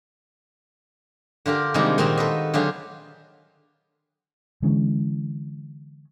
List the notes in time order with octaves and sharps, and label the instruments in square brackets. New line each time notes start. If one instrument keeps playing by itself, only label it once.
[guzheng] D3 F4 G4 A#4
C3 D#3 G3 G#3 A#3 D#4
A#2 D#3 A#3 C4 D#4 F#4
A4 B4 D#5
D3 F#3 F4 G4 G#4
[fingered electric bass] D3 E3 G#3 C#4